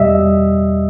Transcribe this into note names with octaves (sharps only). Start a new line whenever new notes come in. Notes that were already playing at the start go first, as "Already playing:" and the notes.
Already playing: E2 B2 G3 D#5 E5